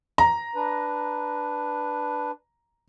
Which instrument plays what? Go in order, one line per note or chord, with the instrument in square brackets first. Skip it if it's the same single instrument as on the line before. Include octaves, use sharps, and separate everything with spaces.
[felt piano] A#5
[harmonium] D4 B4